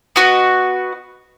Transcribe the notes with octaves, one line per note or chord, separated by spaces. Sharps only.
B3 F#4 D#5